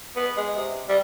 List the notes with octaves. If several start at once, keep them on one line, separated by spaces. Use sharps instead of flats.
B3
G#3
C3
G3